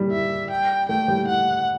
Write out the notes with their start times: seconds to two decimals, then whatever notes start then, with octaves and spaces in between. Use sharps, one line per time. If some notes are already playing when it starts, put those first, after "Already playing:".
Already playing: G3
0.12 E5
0.50 G5
0.89 A3 G5
1.08 G3
1.27 F#5